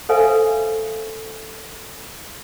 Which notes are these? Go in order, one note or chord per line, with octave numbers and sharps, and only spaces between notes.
A4 B4 C5 E5 F5 G#5